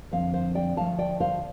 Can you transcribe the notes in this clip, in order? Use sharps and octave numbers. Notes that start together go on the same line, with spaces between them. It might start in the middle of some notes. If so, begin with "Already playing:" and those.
F2 D3 F3 C4 C5 F5
C5 F5
D5 G5
D2 C3 F3 A3 F5 A5
D5 G5
C5 F5